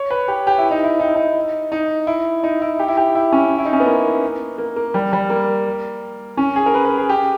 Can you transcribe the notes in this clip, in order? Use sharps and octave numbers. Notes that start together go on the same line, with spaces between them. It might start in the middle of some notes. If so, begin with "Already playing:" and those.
Already playing: C#5
B4
G4
G4
E4
D#4
E4
D#4
E4
D#4
D#4
E4
D#4
E4
G4
E4
G4
E4
C#4
E4
D#4
C#4
B3
A#3
A#3
A#3
G3
G3
A#3
C#4
G#4
A#4
B4
B4
G#4
G4